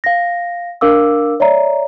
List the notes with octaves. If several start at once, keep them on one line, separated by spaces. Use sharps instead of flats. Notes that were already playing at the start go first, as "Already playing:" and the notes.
F5 A#6
D4 A#4 F5 D6 E6
C#5 D5 E5 A#5